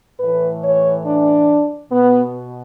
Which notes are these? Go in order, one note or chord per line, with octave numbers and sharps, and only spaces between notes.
A2 E3 B4
C#5
D4
B2 B3